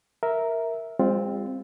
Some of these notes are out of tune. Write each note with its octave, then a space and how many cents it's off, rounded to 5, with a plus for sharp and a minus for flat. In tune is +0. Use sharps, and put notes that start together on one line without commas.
A#4 +0 E5 -10
G#3 -40 C4 +0 F4 +0